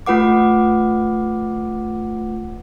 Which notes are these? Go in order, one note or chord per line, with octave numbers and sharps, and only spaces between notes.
A3 F4 B4 F#5 D6